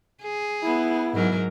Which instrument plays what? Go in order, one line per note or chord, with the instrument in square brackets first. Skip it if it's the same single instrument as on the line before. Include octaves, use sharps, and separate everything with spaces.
[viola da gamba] G#4
[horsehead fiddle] B3 E4
[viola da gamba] G#2 F#3 A#4